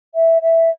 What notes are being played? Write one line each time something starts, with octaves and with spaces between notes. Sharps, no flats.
E5
E5